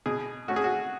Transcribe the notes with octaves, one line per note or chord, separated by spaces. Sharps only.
B2 G#4
A3 C#4 F#4
G#4
F#4